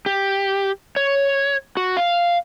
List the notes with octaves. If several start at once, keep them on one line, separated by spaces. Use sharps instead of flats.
G4
C#5
F#4
F5